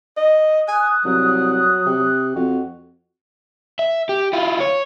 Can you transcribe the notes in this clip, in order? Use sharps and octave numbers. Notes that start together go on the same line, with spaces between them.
D#5
G#5 D#6 F#6
C2 F#3
C3
F2 F#4
E5
G4
E4 F4
C#5